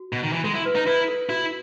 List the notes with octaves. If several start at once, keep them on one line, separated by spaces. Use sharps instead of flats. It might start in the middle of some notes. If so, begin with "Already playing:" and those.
Already playing: F#4
B2
D#3
E3
G#3 A4
E4
B4
D#4
E4 B4
A4
E4 F#4